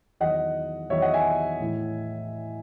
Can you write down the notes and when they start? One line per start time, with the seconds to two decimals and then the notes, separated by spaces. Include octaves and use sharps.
0.20 E2 D#3 F#3 D#5 F#5
0.90 E2 D#3 F#3 C#5 E5
1.02 D#5 F#5
1.13 E5 G#5
1.60 A2 E3